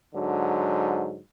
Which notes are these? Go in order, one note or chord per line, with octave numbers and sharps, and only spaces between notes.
G#2 D3 F#3